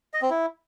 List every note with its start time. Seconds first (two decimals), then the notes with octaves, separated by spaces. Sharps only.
0.14 D#5
0.22 C4
0.30 E4